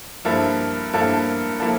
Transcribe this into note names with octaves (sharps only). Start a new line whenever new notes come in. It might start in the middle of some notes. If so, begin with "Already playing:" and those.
G2 F3 A#3 E4 A4
G2 F3 A#3 E4 A4
F3 A#3 E4 A4